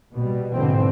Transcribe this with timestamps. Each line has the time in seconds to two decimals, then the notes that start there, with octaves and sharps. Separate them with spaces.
0.13 B2 G3
0.53 G#2 B2 D3 E3 C4